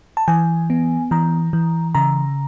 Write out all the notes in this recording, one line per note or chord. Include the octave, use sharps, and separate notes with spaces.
A5
E3 G#5
B3
E3 A#5
E3
C#3 A#5